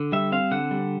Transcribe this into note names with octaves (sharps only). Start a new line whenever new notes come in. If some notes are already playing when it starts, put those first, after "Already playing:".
Already playing: D3
G3 E5
C4 F5
D3 F#5
G3